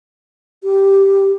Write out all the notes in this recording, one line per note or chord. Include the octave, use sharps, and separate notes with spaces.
G4